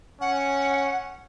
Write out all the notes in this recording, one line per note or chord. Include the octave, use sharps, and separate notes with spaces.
C#4 F#5